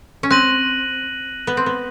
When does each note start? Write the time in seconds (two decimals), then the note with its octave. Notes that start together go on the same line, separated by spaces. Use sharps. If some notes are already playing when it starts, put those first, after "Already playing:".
0.23 C#4
0.30 C4 F#6 A#6 D#7 F#7
1.47 B3
1.57 C4
1.66 B3